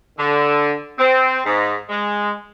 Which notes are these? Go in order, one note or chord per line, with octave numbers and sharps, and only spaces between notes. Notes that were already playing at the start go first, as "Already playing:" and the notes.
D3
C4
G#2
G#3